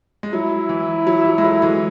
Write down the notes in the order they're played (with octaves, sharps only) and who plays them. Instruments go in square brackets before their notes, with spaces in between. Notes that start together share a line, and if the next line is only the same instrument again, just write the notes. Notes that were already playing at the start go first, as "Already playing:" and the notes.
[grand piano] G#3
[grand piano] F#3 [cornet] E4
[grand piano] E3
F#3
F#3
G#3
F#3 A3
E3 G#3